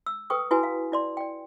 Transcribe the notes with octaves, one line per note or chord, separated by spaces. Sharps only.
E6
A4 B4 G5 C#6 D#6
E4 F#4 B4 G#5 A#5
F5
E4 D5 C6
D5 G5